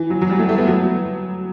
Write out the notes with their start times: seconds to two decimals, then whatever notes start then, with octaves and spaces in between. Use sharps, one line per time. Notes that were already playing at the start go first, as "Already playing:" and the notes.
Already playing: E3
0.10 F#3
0.21 F#3
0.30 G3
0.39 A3
0.49 A3
0.58 B3
0.68 F#3